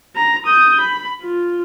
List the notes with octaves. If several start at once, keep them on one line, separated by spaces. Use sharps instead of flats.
A#5
D#6 G6
B5
F4